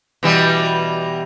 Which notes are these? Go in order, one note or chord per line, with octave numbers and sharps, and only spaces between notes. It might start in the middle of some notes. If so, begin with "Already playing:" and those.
B2 E3 G3